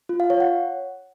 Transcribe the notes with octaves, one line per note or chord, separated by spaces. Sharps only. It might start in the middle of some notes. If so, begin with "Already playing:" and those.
F4
F5
C#5
F#5